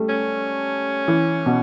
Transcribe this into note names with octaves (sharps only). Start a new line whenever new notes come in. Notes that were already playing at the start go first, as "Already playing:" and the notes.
Already playing: G3 A3
C#4
E3
B2